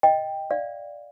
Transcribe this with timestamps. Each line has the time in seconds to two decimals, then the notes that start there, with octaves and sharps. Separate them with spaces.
0.03 D#5 G5
0.51 D5 F5